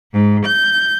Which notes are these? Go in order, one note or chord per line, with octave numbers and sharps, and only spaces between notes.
G#2
G6